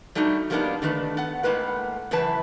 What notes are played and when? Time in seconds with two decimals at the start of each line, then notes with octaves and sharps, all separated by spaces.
0.15 G3 A3 D4 D#4 F#4
0.50 F3 G3 A#3 B3 D4 D#4
0.82 D3 D#3 A3 B4
1.17 B3 F#5
1.43 A2 G#3 A#3 B4 F#5
2.11 F#2 C#3 E3 E4 B4 A5